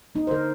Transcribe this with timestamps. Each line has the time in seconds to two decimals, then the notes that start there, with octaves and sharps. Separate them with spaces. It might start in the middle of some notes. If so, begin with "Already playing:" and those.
0.15 A#3 D#4
0.27 C5
0.31 D3 A#4